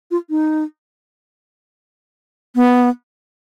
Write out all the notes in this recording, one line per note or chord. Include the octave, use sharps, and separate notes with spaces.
F4
D#4
B3